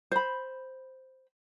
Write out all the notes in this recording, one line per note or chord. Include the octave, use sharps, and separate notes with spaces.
C5 B5